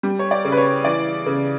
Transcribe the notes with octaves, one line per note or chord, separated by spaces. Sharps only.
G3
C#5
D5
C#3
B4
C#5
E3 D5
C#3